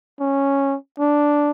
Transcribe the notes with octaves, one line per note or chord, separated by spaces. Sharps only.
C#4
D4